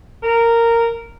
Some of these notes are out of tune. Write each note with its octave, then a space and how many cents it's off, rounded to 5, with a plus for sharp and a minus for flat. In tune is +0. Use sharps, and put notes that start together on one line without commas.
A#4 -10